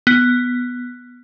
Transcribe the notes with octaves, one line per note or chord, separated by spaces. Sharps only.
B3